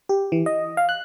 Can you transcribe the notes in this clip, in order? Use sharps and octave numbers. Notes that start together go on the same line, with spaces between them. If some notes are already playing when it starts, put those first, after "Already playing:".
G4
E3
D#5
F5
F#6